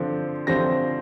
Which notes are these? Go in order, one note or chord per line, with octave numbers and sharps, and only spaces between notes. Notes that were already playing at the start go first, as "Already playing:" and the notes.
Already playing: D3 F3 C4
D3 F3 C4 A#6